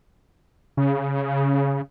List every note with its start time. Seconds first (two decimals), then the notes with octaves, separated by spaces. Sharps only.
0.77 C#3